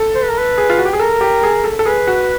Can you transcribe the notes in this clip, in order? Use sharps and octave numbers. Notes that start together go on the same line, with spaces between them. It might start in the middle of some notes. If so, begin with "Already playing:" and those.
Already playing: A4
C5
B4
A#4
B4
G#4
F4
F#4
G4
G#4
A4 A#4
G4
G#4
A4
A4
G#4 B4
F#4